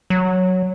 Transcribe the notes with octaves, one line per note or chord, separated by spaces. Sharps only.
F#3